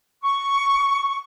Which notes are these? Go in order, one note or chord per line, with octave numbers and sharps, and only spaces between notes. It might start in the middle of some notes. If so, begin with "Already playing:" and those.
C#6